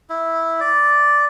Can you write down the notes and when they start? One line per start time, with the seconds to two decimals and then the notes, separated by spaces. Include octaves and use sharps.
0.10 E4
0.60 D5